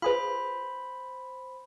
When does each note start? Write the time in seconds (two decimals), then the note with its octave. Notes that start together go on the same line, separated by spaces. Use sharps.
0.02 F4 G#4 B4 C5 B5